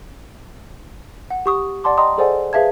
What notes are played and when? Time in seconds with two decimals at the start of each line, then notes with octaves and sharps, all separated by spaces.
1.30 F#5
1.46 G4 C#6 D#6
1.84 D5 F#5 A5 C6 D6
1.98 D#5 G5 A#5 C6 D#6
2.18 G#4 A4 C5 D5 F#5 G#5
2.53 G#4 B4 E5 F5 A5 G#6